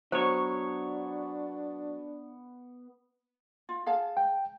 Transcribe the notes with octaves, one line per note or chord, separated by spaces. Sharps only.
F#3 B3 D4 C5 C#5 A5
F4
G#4 F5 A5
G5